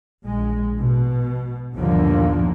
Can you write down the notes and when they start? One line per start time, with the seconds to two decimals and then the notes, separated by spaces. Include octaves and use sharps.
0.24 A#1 G#3
0.80 B2
1.77 G1 D#2 A#2 D3 F3 A#3